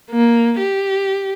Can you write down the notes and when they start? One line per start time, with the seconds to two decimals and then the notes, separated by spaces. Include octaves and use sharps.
0.11 A#3
0.59 G4